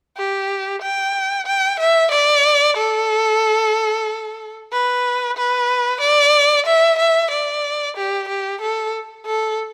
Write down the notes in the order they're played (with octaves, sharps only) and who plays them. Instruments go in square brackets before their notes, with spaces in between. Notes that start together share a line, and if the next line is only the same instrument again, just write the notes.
[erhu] G4
G5
G5
E5
D5
A4
B4
B4
D5
E5
E5
D5
G4
G4
A4
A4